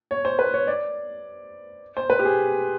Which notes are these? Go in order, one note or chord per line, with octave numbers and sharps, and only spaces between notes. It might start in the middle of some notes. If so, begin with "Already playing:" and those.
C#5
C5
B4
C#5
D5
C5
B4
G4
G#4